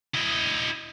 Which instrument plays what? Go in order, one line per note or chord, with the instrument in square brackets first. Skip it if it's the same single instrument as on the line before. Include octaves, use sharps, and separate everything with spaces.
[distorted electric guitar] E4 D#5